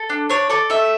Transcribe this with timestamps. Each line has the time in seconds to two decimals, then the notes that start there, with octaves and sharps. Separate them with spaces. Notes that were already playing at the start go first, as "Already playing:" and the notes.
Already playing: A4
0.10 D4
0.29 D4 C#5
0.50 A4 D5
0.70 A3 E5